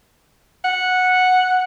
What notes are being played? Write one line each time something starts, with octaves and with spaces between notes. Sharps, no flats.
F#5